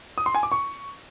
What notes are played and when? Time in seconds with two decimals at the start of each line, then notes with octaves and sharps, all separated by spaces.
0.18 D#6
0.26 C6
0.35 G#5
0.43 D6
0.52 C#6